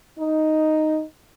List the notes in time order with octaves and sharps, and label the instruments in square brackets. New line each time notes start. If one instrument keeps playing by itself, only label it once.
[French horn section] D#4